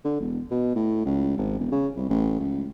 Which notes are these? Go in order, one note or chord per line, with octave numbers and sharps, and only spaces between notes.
D3
E1
B2
A2
C#2
G#1
E1
C#3
C2
A1
C#2